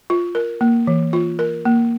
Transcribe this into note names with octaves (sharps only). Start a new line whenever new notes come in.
F4
A#4
A#3
E3
F4
A#4
A#3